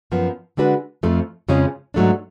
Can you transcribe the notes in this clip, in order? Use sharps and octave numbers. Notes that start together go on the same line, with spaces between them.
F#2 F3 B3
D3 G#3 D4 F#4 B4
F2 F3 A3
F2 C#3 F3 G#3 C#4
G#2 F#3 A3 D4